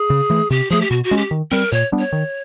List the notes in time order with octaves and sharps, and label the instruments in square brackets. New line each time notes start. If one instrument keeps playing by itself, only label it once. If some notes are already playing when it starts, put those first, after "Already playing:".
Already playing: [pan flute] G#4
[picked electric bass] C#3
E3 A3
[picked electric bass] C3 [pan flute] G4
[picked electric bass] F3 A3 [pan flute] G#4
[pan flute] G4
[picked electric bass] B2 [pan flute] F#4
[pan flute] F#4
[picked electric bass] G#3 C#4
[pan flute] G4
[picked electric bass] D#3
[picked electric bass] G3 C4 [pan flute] A#4
[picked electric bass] A#2 [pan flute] C#5
[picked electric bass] G3 B3 D4
[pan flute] C#5
[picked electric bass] D#3